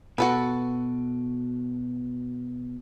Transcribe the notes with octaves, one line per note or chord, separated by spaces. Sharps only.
B2 F#4 A4 B4